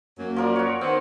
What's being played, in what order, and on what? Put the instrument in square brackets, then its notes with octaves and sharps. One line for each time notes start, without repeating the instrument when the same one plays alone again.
[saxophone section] F#2 F#3 A#3
[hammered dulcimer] F3 A#4 D5
F#4 C#5
[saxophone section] D#3 B3 C5 [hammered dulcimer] C4